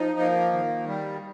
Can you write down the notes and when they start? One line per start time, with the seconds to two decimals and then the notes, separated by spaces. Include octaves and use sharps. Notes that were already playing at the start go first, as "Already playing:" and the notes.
Already playing: F3 D#4
0.19 A#3
0.53 D#3
0.87 G3